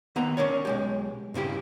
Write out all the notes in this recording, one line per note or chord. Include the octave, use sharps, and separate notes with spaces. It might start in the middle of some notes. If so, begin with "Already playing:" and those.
D#3 B3 A#5
C#4 D4 A#4 C#5
B1 G#3 G4
G2 C#3 E4 G4